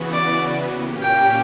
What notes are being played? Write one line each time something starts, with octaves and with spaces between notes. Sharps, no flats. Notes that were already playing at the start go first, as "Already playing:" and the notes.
Already playing: C#3 E3 B3 F#4
D5
A#2 A#3 C#4 G4
G5